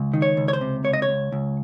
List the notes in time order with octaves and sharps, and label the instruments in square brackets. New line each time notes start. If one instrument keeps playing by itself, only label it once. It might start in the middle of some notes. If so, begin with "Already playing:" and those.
Already playing: [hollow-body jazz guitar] C#2
D#3
C#5
C#2
C#5
C5
C3
C#2 C#5
D#5
C#5
C#2
C#2